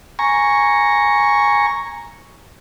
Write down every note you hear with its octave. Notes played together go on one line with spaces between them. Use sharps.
G#5 A#5 C#6